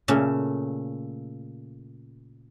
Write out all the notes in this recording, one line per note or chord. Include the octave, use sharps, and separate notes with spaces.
A#2 C#3 A3